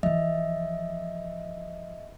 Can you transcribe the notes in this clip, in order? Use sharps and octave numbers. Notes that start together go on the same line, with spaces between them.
E3 F3 D#5 E5